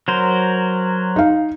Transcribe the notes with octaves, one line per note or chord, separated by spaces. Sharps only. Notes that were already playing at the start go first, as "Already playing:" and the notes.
F#3 A#4 C5
D#4 F5